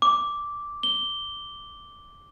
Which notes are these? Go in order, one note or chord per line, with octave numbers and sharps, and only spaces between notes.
D6
G7